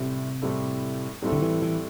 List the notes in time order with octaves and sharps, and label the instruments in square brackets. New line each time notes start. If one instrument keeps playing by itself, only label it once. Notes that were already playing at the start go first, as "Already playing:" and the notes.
Already playing: [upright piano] A2 G3 C4 E4 A4 [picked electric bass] C3
[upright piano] A2 G3 C4 E4 A4
A2 G3 C4 E4 A4
[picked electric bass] D3
E3
E3